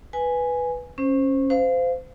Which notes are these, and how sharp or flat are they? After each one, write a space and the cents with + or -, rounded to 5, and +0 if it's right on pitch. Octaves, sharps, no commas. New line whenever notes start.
B4 +0 G#5 +0
C#4 -20 C5 +0
C5 -30 F5 +0